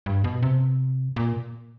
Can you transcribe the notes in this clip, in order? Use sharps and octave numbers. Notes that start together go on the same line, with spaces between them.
G2
B2
C3
A#2